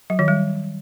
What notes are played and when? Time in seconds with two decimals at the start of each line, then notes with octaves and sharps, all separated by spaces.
0.10 F#3
0.19 D#3
0.28 G3